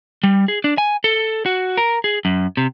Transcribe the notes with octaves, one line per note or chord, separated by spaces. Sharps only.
G3
G#4
D4
G#5
A4
F#4
A#4
G#4
F#2
C3